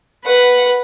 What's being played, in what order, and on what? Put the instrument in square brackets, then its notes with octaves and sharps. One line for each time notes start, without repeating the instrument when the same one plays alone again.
[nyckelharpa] B4 [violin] F#5